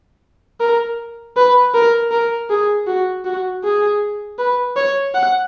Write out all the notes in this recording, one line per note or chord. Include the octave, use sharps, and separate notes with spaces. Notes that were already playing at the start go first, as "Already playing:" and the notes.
A#4
B4
A#4
A#4
G#4
F#4
F#4
G#4
B4
C#5
F#5